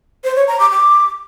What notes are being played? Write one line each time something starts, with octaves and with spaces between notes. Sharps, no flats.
C5
C#5
A#5
D6
D6